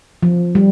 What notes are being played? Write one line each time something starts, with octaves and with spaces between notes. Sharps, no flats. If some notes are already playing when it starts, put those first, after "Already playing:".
F3
G3